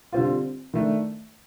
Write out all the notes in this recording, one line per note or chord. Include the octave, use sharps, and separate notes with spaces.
D3 G3 C4 F4
D#3 A3 D4